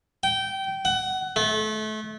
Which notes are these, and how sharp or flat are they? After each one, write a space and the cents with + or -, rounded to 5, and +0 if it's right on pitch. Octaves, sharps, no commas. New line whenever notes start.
G5 -20
F#5 +20
A3 -30